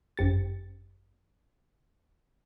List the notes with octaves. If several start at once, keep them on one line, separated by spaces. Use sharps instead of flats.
G1 F#2 G4 A6